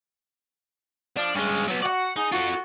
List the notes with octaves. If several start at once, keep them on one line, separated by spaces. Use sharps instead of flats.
F3 D4
G2 G#3 C#4
F#3 B3
F#4 D5 F#5
D#4 G#4
F4 F#4 A4